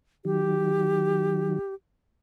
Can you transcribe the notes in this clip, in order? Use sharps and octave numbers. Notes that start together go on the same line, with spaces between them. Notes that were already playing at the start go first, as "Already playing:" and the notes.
D#3 F#3 G4